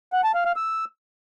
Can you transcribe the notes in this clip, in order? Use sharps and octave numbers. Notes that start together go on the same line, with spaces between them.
F#5
A5
F5
F5
E6